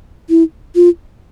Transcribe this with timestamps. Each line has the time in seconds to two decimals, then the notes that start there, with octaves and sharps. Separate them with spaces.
0.29 E4
0.75 F4